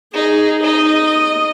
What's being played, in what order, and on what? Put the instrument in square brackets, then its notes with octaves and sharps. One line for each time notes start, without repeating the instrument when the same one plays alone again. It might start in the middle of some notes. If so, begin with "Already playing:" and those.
[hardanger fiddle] D#4 [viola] G#4
[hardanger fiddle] D#4 [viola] D#5